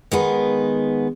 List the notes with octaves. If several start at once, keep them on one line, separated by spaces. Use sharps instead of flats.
D#3 G#3 B3